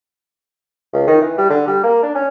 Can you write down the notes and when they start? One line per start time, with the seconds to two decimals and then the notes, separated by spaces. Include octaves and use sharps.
0.93 C#2
1.07 D#3
1.21 E3
1.38 G3
1.50 D3
1.68 G3
1.84 A#3
2.03 D4
2.15 C#4